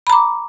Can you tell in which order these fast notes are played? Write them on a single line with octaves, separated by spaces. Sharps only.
B5 A#5 D6